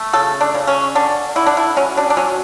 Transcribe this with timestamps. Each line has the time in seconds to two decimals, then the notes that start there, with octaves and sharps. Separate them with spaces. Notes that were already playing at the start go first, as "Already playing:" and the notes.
Already playing: A3
0.13 C#3 A4
0.41 D4
0.55 C#3
0.67 C#4
0.95 D3 D4
1.36 D3 E4
1.47 D4
1.57 E4
1.76 F#3 C#4
1.97 D4
2.10 D4
2.17 F#3 C#4